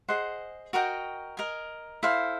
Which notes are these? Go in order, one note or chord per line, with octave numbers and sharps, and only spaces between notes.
G#4 C5 D#5 F#5
F#4 A#4 D#5 G5
A#4 D#5 G#5
E4 A4 C5 F5